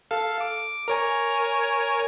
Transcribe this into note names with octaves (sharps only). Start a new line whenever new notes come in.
A4 F5
D6
A#4 C#5 G#5